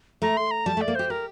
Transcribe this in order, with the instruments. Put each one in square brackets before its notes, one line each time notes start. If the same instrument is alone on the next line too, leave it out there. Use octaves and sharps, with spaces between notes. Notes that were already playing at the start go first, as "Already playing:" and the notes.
[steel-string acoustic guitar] A3 [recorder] A#5
[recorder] C6
A#5
[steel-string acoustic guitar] G3 [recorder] A5
[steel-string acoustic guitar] A3
[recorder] D5
[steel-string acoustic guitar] A#3
[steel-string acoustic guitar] G4 [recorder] C5
[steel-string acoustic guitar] G4 [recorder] A#4